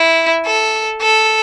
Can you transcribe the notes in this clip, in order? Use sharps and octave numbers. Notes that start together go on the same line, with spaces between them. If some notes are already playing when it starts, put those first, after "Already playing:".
Already playing: E4
A4
A4